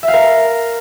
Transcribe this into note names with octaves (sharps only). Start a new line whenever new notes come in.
E5
F5
A#4